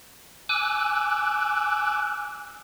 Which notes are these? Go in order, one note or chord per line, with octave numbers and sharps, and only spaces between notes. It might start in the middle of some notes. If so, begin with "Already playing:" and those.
G#5 D6 E6 F#6